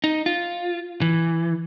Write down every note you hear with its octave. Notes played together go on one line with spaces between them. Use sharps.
D#4
F4
E3